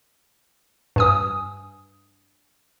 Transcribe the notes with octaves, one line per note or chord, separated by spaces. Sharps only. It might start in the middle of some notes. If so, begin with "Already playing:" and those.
G2 G#5 D#6